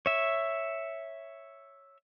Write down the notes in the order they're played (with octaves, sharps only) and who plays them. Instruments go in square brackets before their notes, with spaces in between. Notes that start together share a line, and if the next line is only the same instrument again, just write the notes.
[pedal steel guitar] C#5 E5